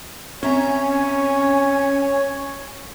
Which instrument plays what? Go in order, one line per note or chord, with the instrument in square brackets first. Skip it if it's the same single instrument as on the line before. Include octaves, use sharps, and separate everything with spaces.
[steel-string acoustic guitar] C4 E5 A#5 [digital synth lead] C#4 [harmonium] C#5 [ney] G#5